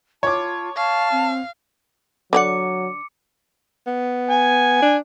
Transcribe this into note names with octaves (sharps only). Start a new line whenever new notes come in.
F4 C#5 A5 D6
F5 A5 C#6
C4
D3 F#3 D5 F#5 D6 C#7
B3
G#5
D4